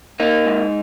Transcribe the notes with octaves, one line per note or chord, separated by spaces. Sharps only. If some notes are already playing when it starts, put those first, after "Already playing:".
A#3 D#4
G#2